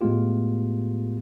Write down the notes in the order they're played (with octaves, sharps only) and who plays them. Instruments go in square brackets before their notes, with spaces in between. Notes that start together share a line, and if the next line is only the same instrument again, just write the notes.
[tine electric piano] A2 G#3 A3 B3 F4 G4